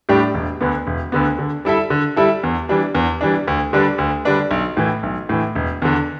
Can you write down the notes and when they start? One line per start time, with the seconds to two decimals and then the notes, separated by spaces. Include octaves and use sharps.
0.09 A2 G3 D4 G4
0.34 E1
0.61 D2 D3 B3
0.87 E1
1.12 D2 D3 B3
1.39 D3
1.65 G3 E4 A4 E5
1.90 D3
2.16 G3 E4 A4 E5
2.43 E2
2.69 E3 G3 D4
2.95 E2
3.21 E3 G3 D4
3.47 D2
3.73 D3 G3 D4 B4
3.98 D2
4.25 D3 G3 D4 B4
4.51 B1
4.77 A2 E3
5.03 B1
5.29 A2 E3
5.55 E1
5.82 E2 D3